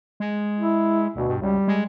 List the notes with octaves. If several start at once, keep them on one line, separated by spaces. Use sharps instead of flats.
G#3
E4
D2 B2
G2
C#2 G3
G#3